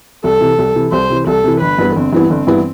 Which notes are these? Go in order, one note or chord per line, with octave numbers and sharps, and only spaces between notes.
C2 A4
C3 E3
C2
C3 E3
C2 C5
C3 E3
C2 A4
C3 E3
G1 B4
G2 E3 B3 E4
G1 C4
G2 E3 B3 E4
G1 C4
G2 E3 B3 E4